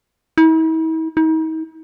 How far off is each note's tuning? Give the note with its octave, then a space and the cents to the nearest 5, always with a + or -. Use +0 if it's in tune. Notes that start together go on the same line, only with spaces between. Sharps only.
E4 -45
D#4 +40